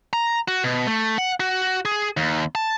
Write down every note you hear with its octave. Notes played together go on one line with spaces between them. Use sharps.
A#5
F#4
B2
A3
F#5
F#4
G#4
D#2
A5